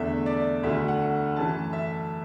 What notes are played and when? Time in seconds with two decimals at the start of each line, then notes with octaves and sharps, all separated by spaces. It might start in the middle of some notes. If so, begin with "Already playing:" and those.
Already playing: E2 D3 A3 E5
0.26 D5
0.63 D2 D3 A3 E5
0.88 F#5
1.36 F#2 E3 A3 A5
1.73 E5